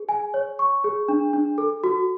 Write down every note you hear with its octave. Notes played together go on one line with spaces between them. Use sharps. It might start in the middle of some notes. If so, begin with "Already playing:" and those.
Already playing: G#4
G#5
C#5
C#6
G#4
D4
D4
A4
F#4